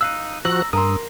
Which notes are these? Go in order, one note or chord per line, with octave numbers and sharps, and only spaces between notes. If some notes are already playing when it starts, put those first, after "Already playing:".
D#4 F5 E6 F#6
F3 F#4 A#5 E6 F#6 F#7
G2 A#4 A#5 C6 D#6 E6